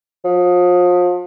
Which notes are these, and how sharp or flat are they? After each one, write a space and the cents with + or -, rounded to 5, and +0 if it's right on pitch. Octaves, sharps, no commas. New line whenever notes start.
F3 +35